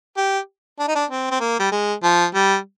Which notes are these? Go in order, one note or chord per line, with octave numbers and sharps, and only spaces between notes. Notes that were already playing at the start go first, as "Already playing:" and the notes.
G4
D4
D#4
D4
C4
C4
A#3
G3
G#3
F3
G3